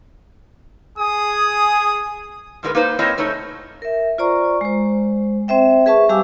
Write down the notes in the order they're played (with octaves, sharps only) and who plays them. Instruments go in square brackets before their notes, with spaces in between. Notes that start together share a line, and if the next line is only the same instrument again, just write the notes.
[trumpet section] G#4 [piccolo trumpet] D#6
[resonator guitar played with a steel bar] G#2 D3 G#3 D#4 A#4 B4
A#3 D#4 B4 C5
A#3 C4 E4 C5 C#5 D#5
C#3 A3 D#4 A4 C5 C#5
[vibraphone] A#4 E5
F4 C5 D5 A#5 C#6
G#3 C5
C4 C5 E5 G5
G#4 B4 E5 A5 C#6
G3 G4 F5 G#5 D6 E6